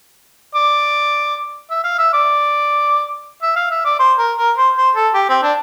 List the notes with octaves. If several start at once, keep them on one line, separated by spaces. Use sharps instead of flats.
D5
E5
F5
E5
D5
E5
F5
E5
D5
C5
A#4
A#4
C5
C5
A4
G4
C4
D4